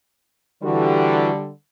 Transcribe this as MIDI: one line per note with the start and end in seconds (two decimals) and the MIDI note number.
0.63 1.49 50
0.63 1.31 52
0.63 1.49 55
0.63 1.31 66